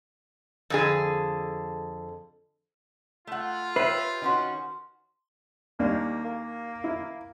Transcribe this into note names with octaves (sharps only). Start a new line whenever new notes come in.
F2 D3 G#4
A3 F4 F#5
G4 B4 C#5 E5 C7
D#3 C#4 F#4 C6
D#2 G3 A#3 D4
A#3
E4